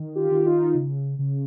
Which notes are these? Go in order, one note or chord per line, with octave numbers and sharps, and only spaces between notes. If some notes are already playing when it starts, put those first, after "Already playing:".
Already playing: D#3
F4 G4
D#3
D#4 F4
C#3
C#3